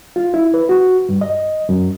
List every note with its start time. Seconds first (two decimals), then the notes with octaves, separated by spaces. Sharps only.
0.16 F4
0.34 E4
0.54 B4
0.69 F#4
1.09 G2
1.21 D#5
1.69 F#2